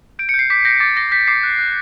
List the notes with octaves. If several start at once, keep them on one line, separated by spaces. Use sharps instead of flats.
G6 D7
C#7
G6
C7
D6 B6
G6 A#6
D6 A6
D6 A#6
G6 B6
D6 C7
F#6
F#6